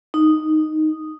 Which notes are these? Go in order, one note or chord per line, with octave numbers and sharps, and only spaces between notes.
D#4